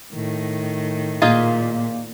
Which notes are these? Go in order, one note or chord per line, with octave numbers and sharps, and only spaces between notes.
A2 D#3
A#2 A#3 D#4 F4 G#4